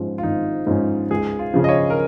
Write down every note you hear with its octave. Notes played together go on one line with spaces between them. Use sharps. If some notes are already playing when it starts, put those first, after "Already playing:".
Already playing: G#2 F3 C#4
F4
G#1 D#4
G#2 F3 C#4
C#2 G#4
F4
C#3 F3
D#5
C#5
A#4